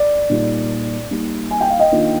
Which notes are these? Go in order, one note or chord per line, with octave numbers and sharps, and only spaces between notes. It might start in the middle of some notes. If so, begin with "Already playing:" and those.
Already playing: D5
A#2 G3 A#3 D#4
G3 A#3 D#4
G#5
G5
F5
D#5 G5
D#3 A#3 D4 F4